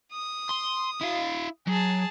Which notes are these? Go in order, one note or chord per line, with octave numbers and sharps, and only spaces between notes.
D#6
C6
E4 F5
F#3 G#4 A5